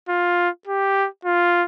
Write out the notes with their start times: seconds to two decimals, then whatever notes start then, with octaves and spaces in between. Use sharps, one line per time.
0.09 F4
0.67 G4
1.25 F4